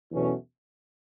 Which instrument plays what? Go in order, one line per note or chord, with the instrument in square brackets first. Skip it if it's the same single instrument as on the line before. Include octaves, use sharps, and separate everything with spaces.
[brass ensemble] E2 B2 F#3 A3 C#4